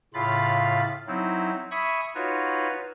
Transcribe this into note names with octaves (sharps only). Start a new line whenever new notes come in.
A2 C#3 F4 F5 B5 A6
F#3 C4 D#4 E4
E5 G#5 B5 C#6 D#6
D#4 F4 F#4 B4 C#5